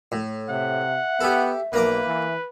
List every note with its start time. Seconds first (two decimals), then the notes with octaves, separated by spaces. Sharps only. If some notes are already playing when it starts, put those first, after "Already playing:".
0.12 A2
0.49 C3 E5 F#5
1.21 B3 G4 A4
1.73 B1 A#3 B4 A#5 D6
2.06 E3